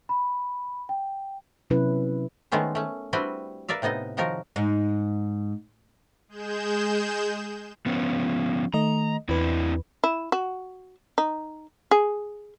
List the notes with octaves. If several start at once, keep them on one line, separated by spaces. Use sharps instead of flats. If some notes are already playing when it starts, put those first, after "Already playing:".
B5
G5
C3 F#3 C#4 E4 B4
D#3 G#3 A3 B3 C#4 C5
A3 C#4
G3 C4 D4 E4 F#4 B4
A#4 B4 D5 E5 F5
A2 C3 B3 D#4 D#5
A2 D#3 F3 D#4 F#4 A#4
G#2
G#3 G#4 G6 E7
F3 B3 C#4
D#3 A3 D#5 A#5
E2 C4 D4 E4 B4
E4
F#4
D#4
G#4